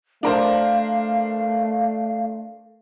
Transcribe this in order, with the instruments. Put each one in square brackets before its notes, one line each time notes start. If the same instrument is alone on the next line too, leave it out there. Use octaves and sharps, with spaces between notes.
[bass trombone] A3 [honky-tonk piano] D4 A#4 C5 [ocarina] F5